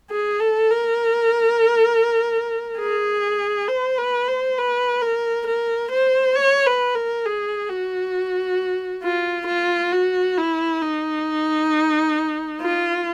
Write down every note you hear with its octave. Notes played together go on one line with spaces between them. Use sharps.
G#4
A4
A#4
G#4
C5
B4
C5
B4
A#4
A#4
C5
C#5
B4
A#4
G#4
F#4
F4
F4
F#4
E4
D#4
F4